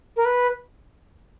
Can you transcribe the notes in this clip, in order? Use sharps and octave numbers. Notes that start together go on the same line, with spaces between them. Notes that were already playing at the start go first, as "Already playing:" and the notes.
A#4
B4